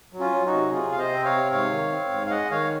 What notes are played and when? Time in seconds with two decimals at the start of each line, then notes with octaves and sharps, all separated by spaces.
0.13 F#3
0.19 C#4 F4
0.32 F#3
0.46 D#4 F#4
0.53 C3
0.72 C3 F4 G#4
0.92 C3 F5
0.99 C5 D#5
1.12 C4
1.25 C#5 F5
1.31 C3
1.51 G#2 C#5 F5
1.71 D#3
1.92 C4
2.11 G#2
2.26 F5
2.30 G#3 D#5 F#5
2.51 D#3 C#5 F5